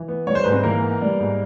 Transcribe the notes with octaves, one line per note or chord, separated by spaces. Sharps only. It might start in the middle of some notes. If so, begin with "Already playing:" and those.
Already playing: E3
B3
G3 C#5
C5
G#2 B4
C4 C5
E3 A#3 A#4
B3
G3
G#2